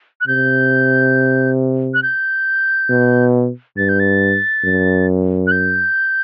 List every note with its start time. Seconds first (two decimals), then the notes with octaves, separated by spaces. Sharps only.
0.21 F#6
0.27 C3 G6
1.94 F#6
2.03 G6
2.90 B2
3.77 G2 A6
3.89 G6
4.00 A6
4.65 F#2
5.47 F#6
5.51 G6